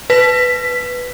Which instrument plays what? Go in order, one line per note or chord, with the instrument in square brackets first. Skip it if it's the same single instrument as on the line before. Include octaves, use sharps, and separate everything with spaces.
[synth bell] B4 B6